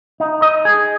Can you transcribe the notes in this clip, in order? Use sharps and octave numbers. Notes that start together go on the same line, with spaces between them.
D#4
D#5
G#4